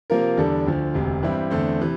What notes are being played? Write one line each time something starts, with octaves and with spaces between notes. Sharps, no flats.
C3 F3 A#3 F4 A#4
E2 D3 G3 D4 A4
D2 D3 F3
E1 D2 C3
G2 E3 G3 C4 E4
E2 D3 A3 C4
C3 E3